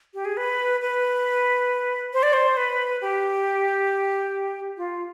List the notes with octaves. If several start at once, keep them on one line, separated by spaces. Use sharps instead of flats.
G4
G#4
B4
B4
C5
D5
C5
B4
G4
F4